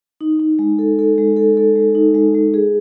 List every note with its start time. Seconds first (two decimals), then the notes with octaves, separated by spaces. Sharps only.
0.21 D#4
0.40 D#4
0.59 G#3
0.79 A4
0.99 A4
1.18 G#3
1.37 A4
1.57 A4
1.76 G#3
1.95 D#4
2.15 G#3
2.34 G#3
2.54 G#4